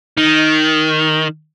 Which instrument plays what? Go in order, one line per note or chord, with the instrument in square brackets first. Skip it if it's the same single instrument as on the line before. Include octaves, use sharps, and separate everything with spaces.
[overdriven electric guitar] D#3